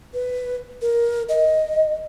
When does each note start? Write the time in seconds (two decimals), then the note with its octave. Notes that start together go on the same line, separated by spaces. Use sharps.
0.14 B4
0.82 A#4
1.29 D#5